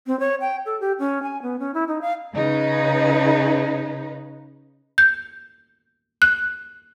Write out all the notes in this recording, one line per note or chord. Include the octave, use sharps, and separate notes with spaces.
C4
C#5
G5
A4
G4
C#4
G#5
B3
C#4
E4
D#4
F5
C#3 D#4 B4
G6
F#6